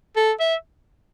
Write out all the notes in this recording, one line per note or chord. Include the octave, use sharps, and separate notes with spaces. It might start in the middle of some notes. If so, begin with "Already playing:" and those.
A4
E5